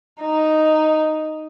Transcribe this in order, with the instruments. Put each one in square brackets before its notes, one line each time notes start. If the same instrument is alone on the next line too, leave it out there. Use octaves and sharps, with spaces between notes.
[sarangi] D#4